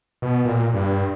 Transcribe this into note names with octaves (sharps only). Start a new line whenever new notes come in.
B2
A#2
G2